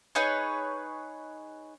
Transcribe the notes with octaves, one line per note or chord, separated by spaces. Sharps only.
D#4 G#4 B4 C#5